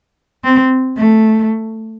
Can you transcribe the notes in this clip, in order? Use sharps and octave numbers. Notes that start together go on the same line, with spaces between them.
C4
A3